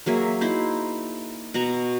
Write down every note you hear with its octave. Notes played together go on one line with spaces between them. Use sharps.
F#3 A#3 G#4 E5
D#4 E4 C5
B2 F#5 A#5 C#6